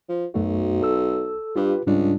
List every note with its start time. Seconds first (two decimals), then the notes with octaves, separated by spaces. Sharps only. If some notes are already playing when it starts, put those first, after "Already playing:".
0.08 F3
0.34 B1 F#2 A3 F#4
0.82 A4 E6
1.56 G2 F4 G4 B4
1.86 C#2 G#2 G3 D4